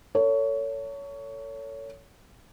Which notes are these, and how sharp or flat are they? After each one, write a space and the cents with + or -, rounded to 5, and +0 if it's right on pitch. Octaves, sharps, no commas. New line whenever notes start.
A4 +35 C#5 +20